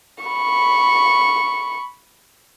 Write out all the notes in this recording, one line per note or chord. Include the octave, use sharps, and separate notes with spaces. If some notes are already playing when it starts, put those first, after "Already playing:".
B5 C#6